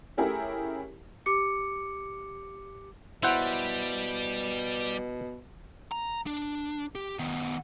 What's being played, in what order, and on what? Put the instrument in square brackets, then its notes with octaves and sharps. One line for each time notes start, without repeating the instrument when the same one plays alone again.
[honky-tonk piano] A3 C#4 E4 G4 G#4 A#4
[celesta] G4 D6 C#7
[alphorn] B2 [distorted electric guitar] G3 [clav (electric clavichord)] E4 C5 F#5
[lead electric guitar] A#5
D4
G4
D#3 B3